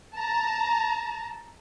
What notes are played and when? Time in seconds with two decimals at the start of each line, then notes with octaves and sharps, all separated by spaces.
0.15 A5 A#5